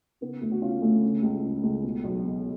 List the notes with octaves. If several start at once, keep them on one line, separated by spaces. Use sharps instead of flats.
C#3 B3
D2
F#4
C#3 C#4 F4
D2 A3 C#4
C#3
C#2
C#3
C#2
B2
B1
B2